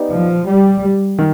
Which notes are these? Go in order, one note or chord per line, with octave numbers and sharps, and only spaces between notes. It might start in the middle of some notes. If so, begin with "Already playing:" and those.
Already playing: B3 D#4 G4 D5
F3
G3
D#3